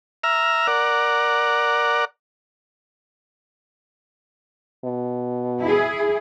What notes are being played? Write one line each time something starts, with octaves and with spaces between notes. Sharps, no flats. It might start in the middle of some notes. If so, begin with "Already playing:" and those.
E5 A#5 F6
A#4 D5 F#5
B2
E4 G#4